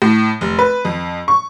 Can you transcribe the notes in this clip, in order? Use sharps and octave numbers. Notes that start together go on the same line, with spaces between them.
A2
F1
B4
F2
C#6